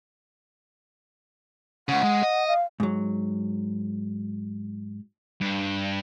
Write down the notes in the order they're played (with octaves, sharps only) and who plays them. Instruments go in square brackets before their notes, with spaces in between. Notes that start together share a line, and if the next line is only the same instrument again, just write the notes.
[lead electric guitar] C#2 C#3 [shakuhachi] F#5
[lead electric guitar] G#3
D#5
[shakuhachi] F5
[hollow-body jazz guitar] G#2 F#3
[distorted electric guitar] G2